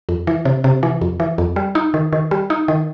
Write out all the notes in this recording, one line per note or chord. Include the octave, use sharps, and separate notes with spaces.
F2
E3
C3
C3
E3
F2
E3
F2
G3
D#4
D#3
D#3
G3
D#4
D#3